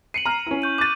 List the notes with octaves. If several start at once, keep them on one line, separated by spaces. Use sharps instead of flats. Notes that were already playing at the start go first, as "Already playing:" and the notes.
C7 C#7 D#7 F#7
A#5 F6
C#4 E4
C#6 G6 D#7
D6 F#6 A6 D#7